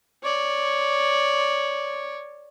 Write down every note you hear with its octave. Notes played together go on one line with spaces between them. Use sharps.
C#5 D5